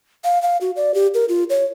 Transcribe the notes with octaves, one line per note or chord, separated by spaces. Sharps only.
F5
F5
F#4
D5
G4
A#4
F4
C#5